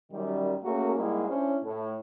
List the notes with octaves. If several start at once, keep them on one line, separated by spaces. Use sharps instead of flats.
F#2 D#3 G3
A3 A#3 C#4 F#4 G#4 A#4
G#2 G3 G#3 A#3 E4
C#4 D4 E4 C5 C#5
A2